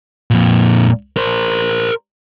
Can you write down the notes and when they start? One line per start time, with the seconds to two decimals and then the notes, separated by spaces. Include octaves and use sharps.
0.31 F2 A#2
1.17 A#4 C5